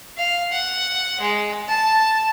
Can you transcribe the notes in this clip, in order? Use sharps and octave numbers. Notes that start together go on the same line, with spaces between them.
F5
F#5
G#3
A5